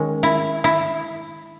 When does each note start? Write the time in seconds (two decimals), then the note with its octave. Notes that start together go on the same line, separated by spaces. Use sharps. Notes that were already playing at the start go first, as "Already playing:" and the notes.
Already playing: D#3 G#3 C#4
0.23 E4
0.64 E4